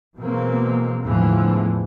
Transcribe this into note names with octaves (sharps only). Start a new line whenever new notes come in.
B2 E3 F#3 G#3 A#3 C4
E2 A2 D3 E3 F3 G#3